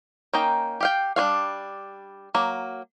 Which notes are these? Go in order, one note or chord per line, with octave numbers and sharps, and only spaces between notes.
A#3 C#4 D#4 G5 A#5
G4 F5 G5
G3 D4 C#5 F5
F#3 A#3